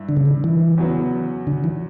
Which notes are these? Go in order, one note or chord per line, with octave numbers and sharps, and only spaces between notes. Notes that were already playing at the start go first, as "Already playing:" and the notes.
Already playing: G2 E4
D3
C#3
D3
E3
E2 C#3 F#3 B3
D3
E3